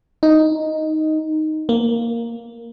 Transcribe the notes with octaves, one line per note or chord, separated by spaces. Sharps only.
D#4
A#3